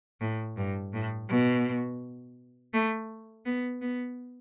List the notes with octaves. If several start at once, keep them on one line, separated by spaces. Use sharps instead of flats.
A2
G2
A2
B2
A3
B3
B3